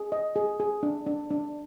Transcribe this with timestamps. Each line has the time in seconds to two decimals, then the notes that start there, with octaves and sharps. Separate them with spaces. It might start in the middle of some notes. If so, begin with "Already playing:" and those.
Already playing: G#4
0.12 D#5
0.36 G#4
0.60 G#4
0.83 D4
1.06 D4
1.30 D4